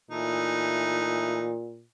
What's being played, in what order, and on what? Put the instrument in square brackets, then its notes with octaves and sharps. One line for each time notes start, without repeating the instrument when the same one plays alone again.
[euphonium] A#2 [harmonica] E3 A3 D#4